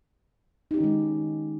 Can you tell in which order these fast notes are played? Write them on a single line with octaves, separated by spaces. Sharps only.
D#4 G4 C#4 D#3 G#3